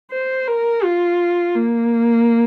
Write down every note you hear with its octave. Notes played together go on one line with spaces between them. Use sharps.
C5
A#4
F4
A#3